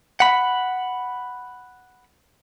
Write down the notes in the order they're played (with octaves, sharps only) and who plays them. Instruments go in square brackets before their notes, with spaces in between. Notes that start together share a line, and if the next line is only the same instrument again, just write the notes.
[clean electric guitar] F#5 B5